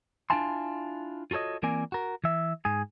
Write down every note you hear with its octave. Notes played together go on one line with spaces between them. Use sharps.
D4 E4 F4 G#5 A5 C6
F4 F#4 A4 C#5 D#5
E3 A#3 C4 A#4 D5 G#5
F#4 A#4
E3 E5
G#2 G#4